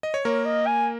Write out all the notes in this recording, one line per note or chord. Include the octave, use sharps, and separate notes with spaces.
D#5
C#5
A#3 A#4 C#5
D#5
G#5